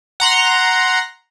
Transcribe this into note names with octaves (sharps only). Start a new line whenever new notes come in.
F#5 A#5 C6